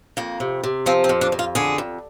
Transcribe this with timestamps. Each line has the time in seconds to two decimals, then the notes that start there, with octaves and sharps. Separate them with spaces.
0.17 F2 A#3
0.40 C3
0.64 C3
0.86 F3 C4
1.04 C4
1.09 F2
1.21 D4
1.32 F2
1.39 F4
1.55 D3 G#4
1.78 F2